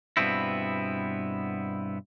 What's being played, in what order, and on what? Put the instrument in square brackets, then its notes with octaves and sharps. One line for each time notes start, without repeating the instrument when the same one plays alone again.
[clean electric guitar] G2 B2 B3 C4 E4